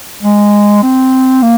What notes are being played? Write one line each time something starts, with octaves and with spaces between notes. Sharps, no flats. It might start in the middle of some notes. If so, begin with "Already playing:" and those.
G#3
C4
A#3